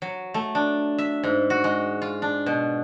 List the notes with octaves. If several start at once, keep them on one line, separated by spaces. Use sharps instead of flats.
F#3
A3
D4
E5
G#2
F#4
G#3
F4
D4
B2